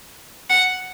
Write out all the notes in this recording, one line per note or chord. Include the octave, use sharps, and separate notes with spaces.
F#5